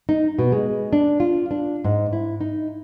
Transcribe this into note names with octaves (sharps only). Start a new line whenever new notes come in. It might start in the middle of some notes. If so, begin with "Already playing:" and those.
D#4
B2
G#3
D4
F4
D4
G#2
E4
D#4